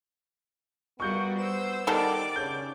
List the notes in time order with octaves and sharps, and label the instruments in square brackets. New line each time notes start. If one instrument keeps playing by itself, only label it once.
[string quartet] G3 A#3 F#4 [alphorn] B3 [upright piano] C#6 G6 C#7
[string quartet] C5 E6
[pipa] D#3 A4 F#5 [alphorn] G3 [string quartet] D5 D6 [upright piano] A5
[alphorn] C#3 [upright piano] C#5 G6